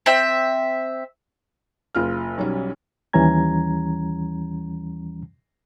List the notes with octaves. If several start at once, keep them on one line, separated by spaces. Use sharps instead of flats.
C4 E5
F#1 F4 F6
B1 F#3 G3 C#4
D#2 E3 G3 C#4 A#5 G#6